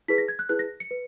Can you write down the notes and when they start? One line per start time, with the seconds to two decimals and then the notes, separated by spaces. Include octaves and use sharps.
0.08 E4 G#4 B4 B6
0.18 A#6
0.28 G#6
0.39 F#6
0.49 E4 G#4 B4 F#6
0.59 A#6
0.80 C#7
0.91 B4